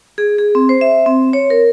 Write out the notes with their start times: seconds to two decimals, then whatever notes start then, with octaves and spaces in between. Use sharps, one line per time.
0.18 G#4
0.38 G#4
0.55 C4
0.69 C5
0.81 E5
1.06 C4
1.33 C#5
1.50 A#4